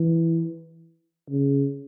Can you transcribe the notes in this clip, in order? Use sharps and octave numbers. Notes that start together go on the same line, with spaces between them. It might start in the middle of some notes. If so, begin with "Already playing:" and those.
Already playing: E3
C#3